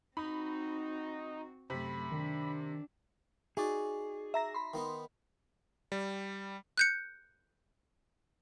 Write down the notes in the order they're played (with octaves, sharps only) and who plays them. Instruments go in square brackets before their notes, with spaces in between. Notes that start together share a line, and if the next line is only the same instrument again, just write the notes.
[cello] C4 F#4 [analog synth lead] D#4 [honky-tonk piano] B5
[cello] F#2 A3 [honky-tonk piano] C3 [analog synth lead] B5
[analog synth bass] D#3 [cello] D4
[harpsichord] D#4 F#4 D5 [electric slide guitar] G#4
[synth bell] E5 A#5 A#6
B5 C6
[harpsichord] D#3 B3 D#4
[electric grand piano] G3
[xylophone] F#6 G6 C#7